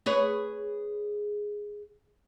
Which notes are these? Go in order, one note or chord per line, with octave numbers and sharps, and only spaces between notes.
G#4 B4 C#5